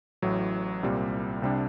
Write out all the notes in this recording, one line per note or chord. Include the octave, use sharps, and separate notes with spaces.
A1 A2 F#3
C2 A#2 G3 C4
C2 C3 G3 D4